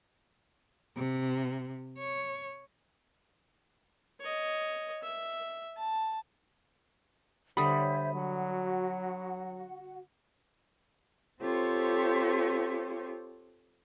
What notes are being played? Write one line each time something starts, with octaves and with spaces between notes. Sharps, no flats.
C3
C#5
C#5 D#5
E5
A5
D3 G3 C5 C#5 E5 B5 D#6
F#3 F#4 F#5
C4 F4 G4 A4 C5 C#5